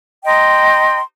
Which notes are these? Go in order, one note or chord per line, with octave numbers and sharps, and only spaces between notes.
D#5 G5 A#5 C6